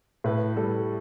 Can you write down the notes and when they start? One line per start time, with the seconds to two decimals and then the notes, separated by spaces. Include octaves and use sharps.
0.24 A2 B4
0.56 G3 A4